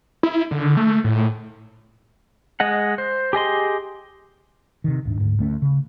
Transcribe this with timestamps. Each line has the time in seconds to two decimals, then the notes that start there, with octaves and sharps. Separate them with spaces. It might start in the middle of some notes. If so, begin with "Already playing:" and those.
0.23 E4
0.51 D3
0.77 A3
1.04 A2
2.60 G#3 D#5 F#5
2.98 C5
3.33 G4 G#4 D#5 C6
4.84 C3 D#3
5.05 D1 G#2 D4
5.20 D2 G#2
5.39 D2 A3 C#4
5.62 C#3